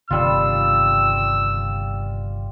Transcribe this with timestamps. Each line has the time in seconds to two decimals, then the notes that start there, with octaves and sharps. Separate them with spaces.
0.11 G1 C3 D#3 G3 F4 E6